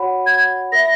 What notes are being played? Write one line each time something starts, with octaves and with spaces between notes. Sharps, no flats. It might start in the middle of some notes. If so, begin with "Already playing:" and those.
Already playing: F#4 C#5 F#5 B5
G#6
A#4 E5 B5 A#6